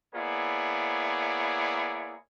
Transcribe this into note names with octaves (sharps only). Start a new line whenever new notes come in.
A#3 B3 E4 G#4 C#5 D5